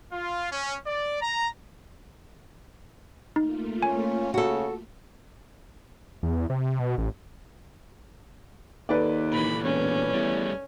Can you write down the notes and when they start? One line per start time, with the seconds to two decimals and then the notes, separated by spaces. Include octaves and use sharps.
0.12 F4
0.52 C#4
0.86 D5
1.21 A#5
3.36 A3 A#3 D#4 F4
3.82 C#4 G#5
4.34 C#3 F#4 A4
6.23 E2
6.50 C3
6.80 B2
6.98 A1
8.89 D#2 A4 B4 D5
9.33 A#2 E3 B5
9.64 E1 C#4
10.13 E2 G3 A3